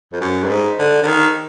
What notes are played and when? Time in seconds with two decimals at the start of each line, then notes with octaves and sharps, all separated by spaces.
0.13 F2
0.21 F#2
0.44 G2
0.49 G#2
0.79 D3
1.03 D3
1.07 D#3